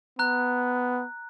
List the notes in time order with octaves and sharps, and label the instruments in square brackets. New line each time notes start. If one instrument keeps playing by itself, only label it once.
[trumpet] B3 [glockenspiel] A#5 F#6